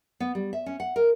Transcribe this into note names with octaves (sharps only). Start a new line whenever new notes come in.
B3
G3
E5
C#4
F#5
A#4